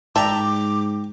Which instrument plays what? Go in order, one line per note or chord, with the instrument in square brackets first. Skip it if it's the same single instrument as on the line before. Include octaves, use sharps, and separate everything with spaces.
[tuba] G#2 [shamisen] D5 E5 A5 [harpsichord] G5 A#5 [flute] D6